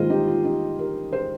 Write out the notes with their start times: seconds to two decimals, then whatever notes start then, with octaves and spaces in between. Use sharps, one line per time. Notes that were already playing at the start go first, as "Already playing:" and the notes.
Already playing: G#2 D#3 G3 A#3 F4 G#4 C5 D#5
0.10 D#4 G4
0.27 F4
0.44 D#4 G4
0.79 G4 A#4
1.13 G#4 C5